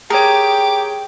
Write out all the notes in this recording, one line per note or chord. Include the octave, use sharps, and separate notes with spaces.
G4 G#4 A#4 C#5 G5 D6